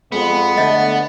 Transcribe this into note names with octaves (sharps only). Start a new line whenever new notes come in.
F2 G#3 B3
D3 A3 D#5